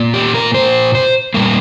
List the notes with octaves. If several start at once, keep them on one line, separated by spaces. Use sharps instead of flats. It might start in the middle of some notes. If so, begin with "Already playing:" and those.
Already playing: A#2 A#3
G4
A#4
C5
C5
A#2 G3 A#3 A#4